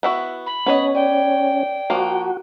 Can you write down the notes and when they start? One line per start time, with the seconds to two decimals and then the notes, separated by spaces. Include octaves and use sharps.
0.03 B3 E4 F#4
0.46 B5
0.66 B3 C#4 C#5 D#5
0.95 D5 G5
1.90 F3 A#3 F#4